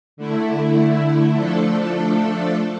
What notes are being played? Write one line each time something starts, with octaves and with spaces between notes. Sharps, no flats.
D3 A3 E4
F3 A3 D4 A4